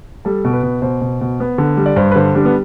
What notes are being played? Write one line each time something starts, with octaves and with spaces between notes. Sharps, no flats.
G3 A4
B2
B4
B2
B2 C5
B2
B2
B3
D3
G3
D5
G2 C5
B4
D3 C5
G3 D4
B3